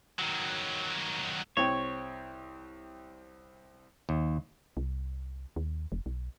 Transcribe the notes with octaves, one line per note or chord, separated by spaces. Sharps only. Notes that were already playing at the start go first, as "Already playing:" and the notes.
D#3 F#3
C2 C4 C#5 G5
D#2
C2
D#2
F1
B1